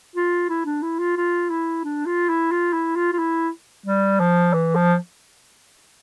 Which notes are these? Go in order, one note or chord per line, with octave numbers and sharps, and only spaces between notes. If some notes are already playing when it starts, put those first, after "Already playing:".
F4
E4
D4
E4
F4
F4
E4
D4
F4
E4
F4
E4
F4
F4
E4
G3
F3
E3
F3